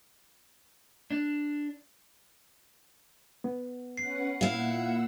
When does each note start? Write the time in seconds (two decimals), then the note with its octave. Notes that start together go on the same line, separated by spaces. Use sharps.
1.11 D4
3.44 B3
3.97 C#4 B4 F#5 C7
4.41 A#2 E4 F5 F#5 E6